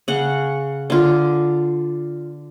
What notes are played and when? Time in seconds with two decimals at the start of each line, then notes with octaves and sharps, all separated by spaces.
0.08 C#3 F#5
0.90 D3 F4